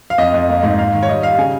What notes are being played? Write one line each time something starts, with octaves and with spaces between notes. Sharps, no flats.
F5
F2 D#5
F2
A#3
G#2
A#3 F5
D#3
C#5
G3 D#5
G3 F5
C#3 G#5